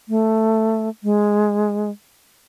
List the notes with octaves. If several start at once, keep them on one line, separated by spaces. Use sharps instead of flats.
A3
G#3